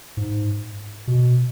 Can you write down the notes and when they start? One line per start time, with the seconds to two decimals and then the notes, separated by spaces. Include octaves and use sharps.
0.17 G#2
1.07 B2